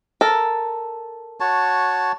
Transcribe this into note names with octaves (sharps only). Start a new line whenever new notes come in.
A4 A#4
F#4 C#5 A5